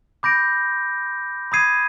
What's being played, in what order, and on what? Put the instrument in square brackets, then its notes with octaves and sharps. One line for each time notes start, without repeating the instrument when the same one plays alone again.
[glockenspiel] B5 D6 G6 A#6 D7
B5 D#6 G#6 C7 D#7